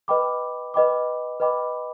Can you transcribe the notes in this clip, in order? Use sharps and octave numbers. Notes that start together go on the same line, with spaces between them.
B4 D#5 G5 B5 D6
B4 D#5 G5 B5 D6
B4 D#5 G5 B5 D6